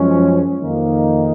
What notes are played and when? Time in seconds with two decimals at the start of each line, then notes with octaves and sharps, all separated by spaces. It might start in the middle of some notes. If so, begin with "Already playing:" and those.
Already playing: F#2 F3 G#3 C#4
0.62 F2 D#3 A#3 D#4